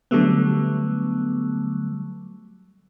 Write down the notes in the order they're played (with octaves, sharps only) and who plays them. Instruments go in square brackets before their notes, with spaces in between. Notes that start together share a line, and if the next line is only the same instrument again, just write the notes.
[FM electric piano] D3 F#3 G3 A3 B3